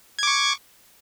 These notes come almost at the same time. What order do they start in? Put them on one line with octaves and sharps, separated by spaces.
G#6 D6 C#6